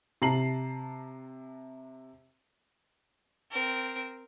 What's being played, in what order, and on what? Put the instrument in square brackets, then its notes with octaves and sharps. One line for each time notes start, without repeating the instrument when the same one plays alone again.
[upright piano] C3 A5 A#5 C7 F#7
[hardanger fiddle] C4 A#4